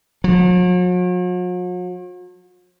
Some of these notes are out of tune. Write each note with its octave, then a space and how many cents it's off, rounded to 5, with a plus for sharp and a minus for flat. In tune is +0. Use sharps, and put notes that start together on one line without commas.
F#3 -45